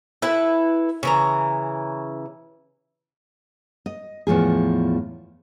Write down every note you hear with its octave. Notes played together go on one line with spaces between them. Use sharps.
E4 A4 B4 E5
C#3 E3 A#5
D#5
E2 A2 F3 G#4